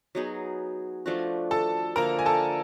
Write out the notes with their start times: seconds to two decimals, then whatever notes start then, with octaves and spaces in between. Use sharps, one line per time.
0.15 F#3 B3 D#4 G#4
1.06 F3 A3 D4 F#4
1.51 A4 A5
1.96 D3 F3 A#3 A#4 A#5
2.19 G#5
2.26 A4 A5